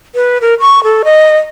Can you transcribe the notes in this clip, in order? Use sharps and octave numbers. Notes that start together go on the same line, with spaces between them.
B4
A#4
C#6
A4
D#5